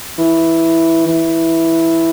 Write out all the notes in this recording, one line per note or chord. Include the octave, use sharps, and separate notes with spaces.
E3
E3